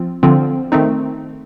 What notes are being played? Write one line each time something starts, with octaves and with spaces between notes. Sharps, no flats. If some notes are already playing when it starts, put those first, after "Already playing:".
Already playing: F3 C4 F4
D3 F3 C4 F4
D#3 A3 C4 D#4